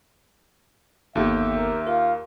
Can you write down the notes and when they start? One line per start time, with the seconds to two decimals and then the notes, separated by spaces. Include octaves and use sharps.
1.15 G1 D#2 B3 G4 A4 E5
1.56 A#4
1.87 F4 A#4